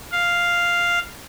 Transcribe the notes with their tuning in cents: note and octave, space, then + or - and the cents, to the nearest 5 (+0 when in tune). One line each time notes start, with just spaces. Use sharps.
F5 +0